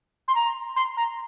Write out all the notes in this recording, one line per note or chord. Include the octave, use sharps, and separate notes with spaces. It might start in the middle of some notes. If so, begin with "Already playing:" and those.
C6
A#5
C6
A#5